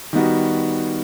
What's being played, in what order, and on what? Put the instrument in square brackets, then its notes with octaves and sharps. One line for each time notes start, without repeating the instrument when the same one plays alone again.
[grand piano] D#3 G3 B3 D#4 F#4